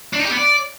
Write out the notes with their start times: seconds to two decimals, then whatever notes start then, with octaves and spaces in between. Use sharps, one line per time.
0.13 D4
0.19 D#4
0.25 G4
0.31 B3
0.38 D5